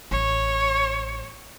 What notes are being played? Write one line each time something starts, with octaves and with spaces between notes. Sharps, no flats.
A1 C#5